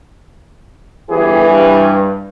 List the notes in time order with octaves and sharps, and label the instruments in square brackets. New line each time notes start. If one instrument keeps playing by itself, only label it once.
[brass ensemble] G1 G4 G#4 [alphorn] E3
[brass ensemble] G2